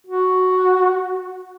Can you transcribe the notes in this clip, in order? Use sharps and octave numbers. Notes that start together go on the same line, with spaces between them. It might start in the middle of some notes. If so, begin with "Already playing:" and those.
F#4